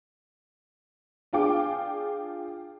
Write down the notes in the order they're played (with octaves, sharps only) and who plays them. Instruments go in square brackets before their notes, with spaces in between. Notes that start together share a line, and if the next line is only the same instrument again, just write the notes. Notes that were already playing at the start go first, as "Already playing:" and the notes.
[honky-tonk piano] D4 F4 G#4 G5 D6